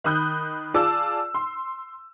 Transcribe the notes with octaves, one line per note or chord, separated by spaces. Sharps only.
D#3 B5 D#6 F#6 G6
F4 G#4 D5 A5 D6 E6
C6